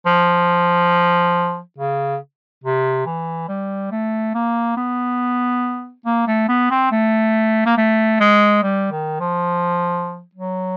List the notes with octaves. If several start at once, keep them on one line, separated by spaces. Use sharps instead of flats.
F3
C#3
C3
E3
G3
A3
A#3
B3
A#3
A3
B3
C4
A3
A#3
A3
G#3
G3
D#3
F3
F#3